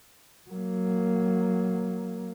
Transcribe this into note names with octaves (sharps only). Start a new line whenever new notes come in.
F#3 A#3